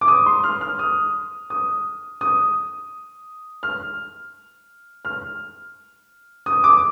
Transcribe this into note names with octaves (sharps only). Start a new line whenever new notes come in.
D6
D#6
C6
F6
F6
D#6
D#6
D#6
F6
F6
D#6
D6